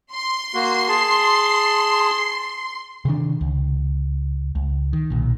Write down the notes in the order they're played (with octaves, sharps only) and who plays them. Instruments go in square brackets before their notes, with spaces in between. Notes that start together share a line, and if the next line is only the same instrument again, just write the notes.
[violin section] C6
[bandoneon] A#3 F#4
G#4 A5
[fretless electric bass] C3 D#3 D4
C#2
C#2
D#3
B1 A#2